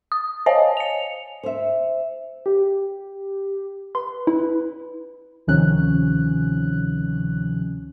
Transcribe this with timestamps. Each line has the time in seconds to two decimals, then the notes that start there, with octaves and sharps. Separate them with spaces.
0.12 D#6
0.46 C5 C#5 D#5 F5 G#5 A5
0.77 C#7 F7
1.43 C5 E5
2.46 G4
3.95 B4 C6
4.27 E4
5.47 D2 C3 D#3 F3 C#4 F#6